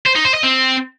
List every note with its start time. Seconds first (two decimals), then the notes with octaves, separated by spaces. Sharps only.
0.06 C5
0.16 D#4
0.25 C5
0.34 D#5
0.43 C4